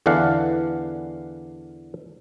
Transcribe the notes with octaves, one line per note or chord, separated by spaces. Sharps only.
E2 D3 E3 D4 F5 F#5